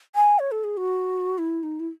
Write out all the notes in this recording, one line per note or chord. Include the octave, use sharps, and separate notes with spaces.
G#5
C#5
A4
G#4
F#4
E4
D#4
E4